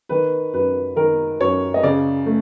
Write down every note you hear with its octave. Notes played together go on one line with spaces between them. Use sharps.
D#3 B4
F#2 B4
D#3 A#4
F#2 C#5
D#5
C#3 D5
A3